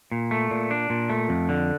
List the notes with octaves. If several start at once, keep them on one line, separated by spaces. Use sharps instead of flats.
A#2
A3
A#2
D4
A#2
A3
F2
D3